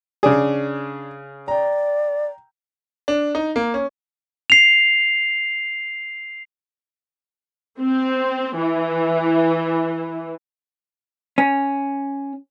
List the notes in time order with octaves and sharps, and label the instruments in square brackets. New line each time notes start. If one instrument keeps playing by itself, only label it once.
[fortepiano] C#3 G#4 [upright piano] D4 D5
[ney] D5 [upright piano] G5 A#5
[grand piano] D4
D#4
A#3
C#4
[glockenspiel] C7 F7
[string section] C4
E3
[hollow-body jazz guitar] C#4